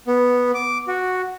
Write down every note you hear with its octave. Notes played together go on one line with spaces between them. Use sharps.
B3
D6
F#4